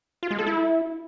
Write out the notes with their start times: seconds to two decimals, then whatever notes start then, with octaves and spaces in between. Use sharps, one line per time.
0.23 F4
0.31 G#3
0.39 A4
0.47 E4